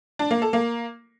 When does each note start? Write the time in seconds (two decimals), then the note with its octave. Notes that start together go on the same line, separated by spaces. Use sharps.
0.19 D4
0.31 A#3
0.42 A4
0.53 A#3